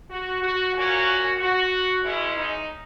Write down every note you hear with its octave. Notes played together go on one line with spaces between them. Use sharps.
F#4
F#4
A#2 A#3 C#4 F#4
F#4
B2 G#3 C#4 E4
D#4